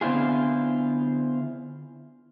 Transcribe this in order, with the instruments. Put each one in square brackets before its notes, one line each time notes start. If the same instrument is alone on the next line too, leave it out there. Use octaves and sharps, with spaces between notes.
[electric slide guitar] D3 B3 C4 E4 F4 G#4